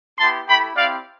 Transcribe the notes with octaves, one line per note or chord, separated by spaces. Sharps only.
B3 E4 G4 A5 C6
A3 E4 G4 G5 B5
C4 E4 G4 D5 F5